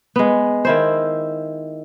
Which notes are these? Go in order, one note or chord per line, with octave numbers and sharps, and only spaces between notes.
G#3 B3
D#3 E4 C5